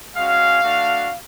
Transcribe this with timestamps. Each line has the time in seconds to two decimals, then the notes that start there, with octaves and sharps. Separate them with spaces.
0.16 G#3 C#4 F#4 F5
0.63 A3 D4 F#4